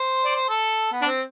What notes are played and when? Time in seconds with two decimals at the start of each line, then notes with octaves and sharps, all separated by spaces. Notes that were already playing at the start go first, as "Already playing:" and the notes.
Already playing: C5
0.24 D5
0.35 C5
0.49 A4
0.92 B3
1.02 D4
1.07 C4